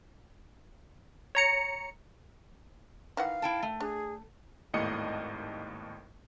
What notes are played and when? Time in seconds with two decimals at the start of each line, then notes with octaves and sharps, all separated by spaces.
1.35 C#5 A#5 C#7
3.17 D#3 E3 F5 F#5
3.42 E4 G5 A5
3.63 A3
3.80 D4 G#4
4.74 G#1 D#2 A2 D#5 C#7